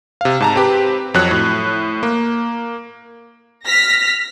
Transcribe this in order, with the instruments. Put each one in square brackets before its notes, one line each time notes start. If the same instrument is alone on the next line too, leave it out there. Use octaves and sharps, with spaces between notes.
[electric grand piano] C3 F5
G#2 A5 A#5
C4 G4 B4
F2 F#3 C#5 F#6
A2
A#3
[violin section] F6 A#6 B6